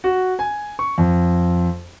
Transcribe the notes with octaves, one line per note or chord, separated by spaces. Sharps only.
F#4
G#5
C#6
F2